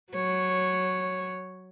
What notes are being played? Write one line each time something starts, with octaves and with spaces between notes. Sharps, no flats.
F#3 C#5